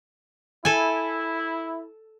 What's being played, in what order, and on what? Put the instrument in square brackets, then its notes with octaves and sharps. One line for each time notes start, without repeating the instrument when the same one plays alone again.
[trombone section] E4 [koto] A4 G#5